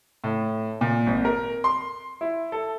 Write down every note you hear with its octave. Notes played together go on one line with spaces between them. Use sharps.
A2
A#2
G#1
A#4
C6
E4
A4